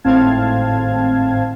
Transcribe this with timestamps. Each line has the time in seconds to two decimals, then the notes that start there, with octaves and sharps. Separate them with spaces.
0.04 G#1 A2 C4 F5 A5 G#6